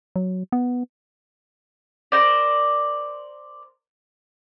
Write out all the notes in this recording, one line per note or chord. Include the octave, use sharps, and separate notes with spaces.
F#3
B3
A#4 C5 D5